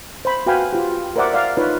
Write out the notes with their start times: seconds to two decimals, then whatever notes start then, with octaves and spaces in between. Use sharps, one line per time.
0.25 C5 B5
0.46 F#4 B4 F5 G5 G#5 B5
0.73 F4 G4
1.16 A#4 C5 D5 E5 F#5 D6
1.33 D5 F5 F#5
1.57 D#4 F4 B4 C#5